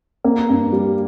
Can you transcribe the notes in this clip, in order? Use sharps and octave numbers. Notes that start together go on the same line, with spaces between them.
A#3
G2
G3